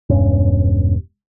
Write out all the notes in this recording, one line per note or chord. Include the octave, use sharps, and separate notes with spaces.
E1 G2 C#4